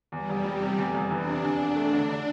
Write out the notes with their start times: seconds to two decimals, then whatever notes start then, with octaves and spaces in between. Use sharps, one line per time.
0.12 E2 G3
0.29 F1
0.44 G3
0.61 C3
0.77 E2 A3
0.95 F1
1.11 E3 D4
1.28 C3
1.43 E2 D4
1.60 E1
1.76 A3
1.93 D3
2.09 D3